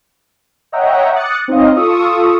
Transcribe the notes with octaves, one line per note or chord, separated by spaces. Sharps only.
C#5 D#5 E5 F#5 G5 A#5
D6 D#6 F#6 A6 C#7
C4 D#4 C#5 D#5 F5
F4 A4 C#6 D#6 E6